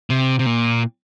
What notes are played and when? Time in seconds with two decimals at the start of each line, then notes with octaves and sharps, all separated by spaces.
0.10 C3
0.39 C3
0.46 A#2